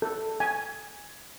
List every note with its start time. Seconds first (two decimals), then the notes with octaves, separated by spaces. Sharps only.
0.02 A4
0.40 G#5